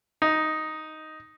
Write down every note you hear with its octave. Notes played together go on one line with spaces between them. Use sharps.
D#4